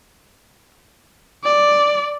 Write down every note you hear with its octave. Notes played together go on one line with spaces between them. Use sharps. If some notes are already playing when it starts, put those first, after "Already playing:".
D5